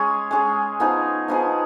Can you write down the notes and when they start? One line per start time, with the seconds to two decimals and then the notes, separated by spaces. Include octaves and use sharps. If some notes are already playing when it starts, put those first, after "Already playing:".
Already playing: G#3 C#4 G#4
0.31 G#3 C#4 G#4
0.80 F3 B3 D#4 G#4
1.28 F3 B3 D#4 G#4